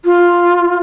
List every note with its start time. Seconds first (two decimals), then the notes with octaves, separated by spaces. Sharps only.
0.05 F4